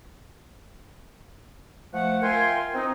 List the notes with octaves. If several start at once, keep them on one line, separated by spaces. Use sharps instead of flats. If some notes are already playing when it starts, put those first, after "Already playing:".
F3 A3 F#5
F4 A#4 E5 G5 G#5 C6
C4 D#4